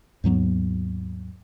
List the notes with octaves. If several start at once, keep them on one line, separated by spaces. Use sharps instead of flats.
D#2 G#2 F#3 B3